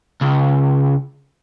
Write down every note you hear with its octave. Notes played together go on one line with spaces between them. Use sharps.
C#2